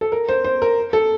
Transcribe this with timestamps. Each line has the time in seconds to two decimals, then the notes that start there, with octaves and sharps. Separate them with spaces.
0.01 A4
0.12 A#4
0.29 C5
0.44 C5
0.62 A#4
0.93 A4